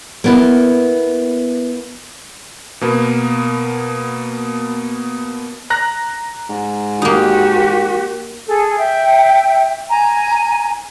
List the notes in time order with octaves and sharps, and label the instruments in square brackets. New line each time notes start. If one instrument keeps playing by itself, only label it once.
[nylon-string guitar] A#3 B3 E4
[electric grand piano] B2 A#3 B3
A#5 F#6 A#6
[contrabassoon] G#2
[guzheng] A#3 D#4 [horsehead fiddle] F#4 G4
[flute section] G#4 A4
E5 G5
G#5 A#5